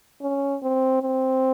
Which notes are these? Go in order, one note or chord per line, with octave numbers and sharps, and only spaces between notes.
C#4
C4
C4